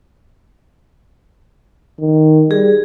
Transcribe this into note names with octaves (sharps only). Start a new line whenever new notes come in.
D#3
G3 G#4